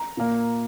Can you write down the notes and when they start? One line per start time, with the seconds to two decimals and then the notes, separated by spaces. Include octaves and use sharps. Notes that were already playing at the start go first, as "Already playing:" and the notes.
Already playing: A#5
0.17 A#2 A#3